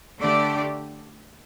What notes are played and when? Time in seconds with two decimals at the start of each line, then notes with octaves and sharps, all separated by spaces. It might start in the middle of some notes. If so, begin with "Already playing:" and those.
0.19 D3 A3 D4 G4 D5